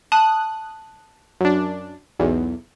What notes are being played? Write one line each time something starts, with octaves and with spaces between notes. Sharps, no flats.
A5 D#6 F#6
F#2 D4
B1 E2